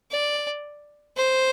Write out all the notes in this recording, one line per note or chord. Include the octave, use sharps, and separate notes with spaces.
D5
C5